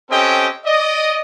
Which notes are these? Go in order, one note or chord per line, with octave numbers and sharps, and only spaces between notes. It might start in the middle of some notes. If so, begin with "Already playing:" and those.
C4 C#4 G4 A4 D#5 G5
D5 D#5